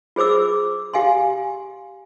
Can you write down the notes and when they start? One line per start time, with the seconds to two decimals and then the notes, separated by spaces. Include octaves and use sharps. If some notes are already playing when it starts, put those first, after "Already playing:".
0.16 F4 G#4 C5 D6 E6
0.93 G4 F5 G#5 C6